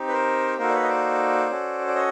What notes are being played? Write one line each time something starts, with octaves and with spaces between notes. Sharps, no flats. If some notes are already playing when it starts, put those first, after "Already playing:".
Already playing: C4 D#4 G4
B4
A#4 C5
A#3 D#4 F#4 A4 A#4 C5
D5
B4 C#5
D#5
C5 D5
C#4 F#4 A4
D5
C#5 D#5